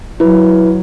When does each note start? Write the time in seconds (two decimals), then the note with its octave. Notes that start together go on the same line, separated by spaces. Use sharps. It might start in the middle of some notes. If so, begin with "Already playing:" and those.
0.20 F#3 E4 B4